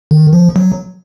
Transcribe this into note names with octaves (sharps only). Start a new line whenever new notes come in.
D#3
F3
F#3